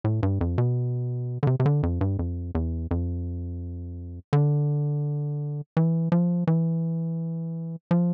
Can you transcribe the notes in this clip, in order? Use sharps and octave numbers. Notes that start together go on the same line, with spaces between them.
A2
G2
F2
B2
D3
C3
C3
D3
F2
G2
F2
E2
F2
D3
E3
F3
E3
F3